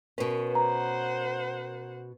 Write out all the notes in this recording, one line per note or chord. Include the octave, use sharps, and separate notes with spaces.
B2 C#4 A#4 B4
C5 F#5 A#5